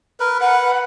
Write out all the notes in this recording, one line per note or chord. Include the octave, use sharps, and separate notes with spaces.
A#4 B4
B4 F#5